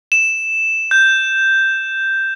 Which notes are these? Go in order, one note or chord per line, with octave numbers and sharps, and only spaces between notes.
E7
G6